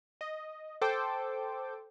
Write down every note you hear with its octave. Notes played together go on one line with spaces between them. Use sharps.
D#5
A4 C5 G5 D6